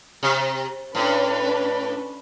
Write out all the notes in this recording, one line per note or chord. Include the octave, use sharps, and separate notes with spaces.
C3
A2 C#4 D4 B4